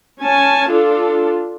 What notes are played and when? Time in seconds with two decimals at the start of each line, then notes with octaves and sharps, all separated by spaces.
0.22 C#4 G#5 A5
0.71 D4 F4 A4